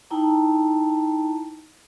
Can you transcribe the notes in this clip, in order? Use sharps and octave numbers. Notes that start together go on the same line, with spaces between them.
D#4 E4 G5 A5 A#5